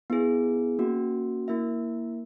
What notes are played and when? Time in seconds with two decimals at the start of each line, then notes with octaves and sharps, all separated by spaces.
0.10 B3 E4 G#4
0.79 A#3 C#4 F#4
1.48 A#3 E4 A#4 E5